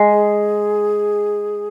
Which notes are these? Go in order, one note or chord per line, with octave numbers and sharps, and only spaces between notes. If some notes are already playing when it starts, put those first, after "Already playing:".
Already playing: G#3
G#4